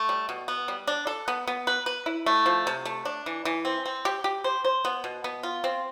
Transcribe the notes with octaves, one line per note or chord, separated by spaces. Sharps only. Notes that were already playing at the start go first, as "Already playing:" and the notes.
Already playing: A3
G3
B2
B3
G3
D4
A4
B3
B3
B4
B4
E4
A3
F3
C3
A3
D4
E3
E3
C4
C4
G4
G4
C5
C5
B3
B2
B3
F4
C4